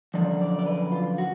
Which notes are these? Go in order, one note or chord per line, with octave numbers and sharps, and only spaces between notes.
F#2 D3 F3 D5
D5
D5
B4
F4
F#4